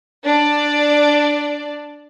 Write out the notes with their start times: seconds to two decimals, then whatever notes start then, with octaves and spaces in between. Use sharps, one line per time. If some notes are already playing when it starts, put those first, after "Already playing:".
0.25 D4 D5